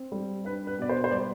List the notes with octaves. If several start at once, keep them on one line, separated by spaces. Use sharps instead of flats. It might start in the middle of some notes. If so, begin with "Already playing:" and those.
Already playing: C4
G3
D4 B4
B4
B2 D5
C5
C5
G3 D5